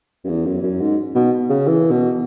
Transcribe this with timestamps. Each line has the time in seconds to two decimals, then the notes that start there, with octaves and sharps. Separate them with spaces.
0.24 F#2
0.29 E2
0.46 F#2
0.63 F#2
0.81 G#2
1.15 B2
1.50 C#3
1.68 E3
1.91 B2